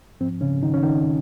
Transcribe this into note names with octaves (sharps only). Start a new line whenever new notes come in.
G#2 F3 C4
C#3 C#4
D#3 D#4
C#4
D#3 D#4